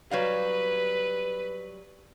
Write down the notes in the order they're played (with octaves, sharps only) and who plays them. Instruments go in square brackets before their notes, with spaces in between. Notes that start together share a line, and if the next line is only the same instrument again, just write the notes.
[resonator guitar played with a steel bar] F#3 G3 F5 [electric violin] B4